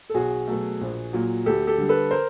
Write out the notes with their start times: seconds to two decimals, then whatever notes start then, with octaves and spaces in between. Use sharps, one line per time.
0.10 A4
0.14 B1 F#4 G#4
0.48 B2 F#3 A3
0.81 A#1
1.13 A#2 F#3
1.46 D2 G4 A4
1.67 G4 A4
1.78 D3 G3
1.89 A4 B4
2.11 A#4 C5